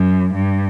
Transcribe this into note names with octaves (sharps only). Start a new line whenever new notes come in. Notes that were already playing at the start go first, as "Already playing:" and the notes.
Already playing: F#2
G2